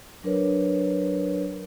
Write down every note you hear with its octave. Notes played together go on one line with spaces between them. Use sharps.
F#3 D4 A#4 B4 C#5